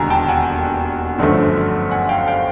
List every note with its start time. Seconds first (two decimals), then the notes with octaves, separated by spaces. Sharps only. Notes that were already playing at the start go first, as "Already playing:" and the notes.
Already playing: E1 D#2 D3 G#5 A#5
0.10 G5 A5
0.28 F#5 G#5
1.19 G1 F#2 D3 F3 A3
1.91 F#5 G#5
2.09 F5 G5
2.27 F5 G5